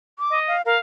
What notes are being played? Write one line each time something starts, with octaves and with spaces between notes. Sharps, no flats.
D6
D#5
F5
A#4 F5